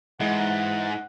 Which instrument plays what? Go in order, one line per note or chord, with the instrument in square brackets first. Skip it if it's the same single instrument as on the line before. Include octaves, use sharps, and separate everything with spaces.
[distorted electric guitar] G#2 [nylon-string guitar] E3 G#3 [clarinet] F#5